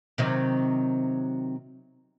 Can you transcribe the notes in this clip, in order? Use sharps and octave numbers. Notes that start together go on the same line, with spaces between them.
C3 D#3 F#3